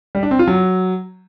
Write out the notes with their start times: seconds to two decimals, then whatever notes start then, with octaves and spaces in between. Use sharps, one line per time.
0.15 G3
0.23 D4
0.31 C4
0.39 F4
0.47 F#3